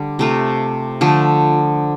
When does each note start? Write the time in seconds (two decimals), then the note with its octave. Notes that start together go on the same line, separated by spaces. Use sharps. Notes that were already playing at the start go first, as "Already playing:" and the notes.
Already playing: D3 G3 D4
0.19 C3 A3 F4
1.01 D3 F3 A3